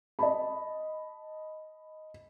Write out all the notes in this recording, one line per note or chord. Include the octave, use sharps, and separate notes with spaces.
D#5 A5 B5